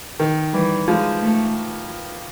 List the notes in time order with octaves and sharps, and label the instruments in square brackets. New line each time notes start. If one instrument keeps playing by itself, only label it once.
[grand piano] D#3
[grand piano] E3 [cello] G3
[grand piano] F3 [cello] G#3
[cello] A3